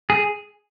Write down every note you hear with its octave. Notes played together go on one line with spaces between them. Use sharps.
G#4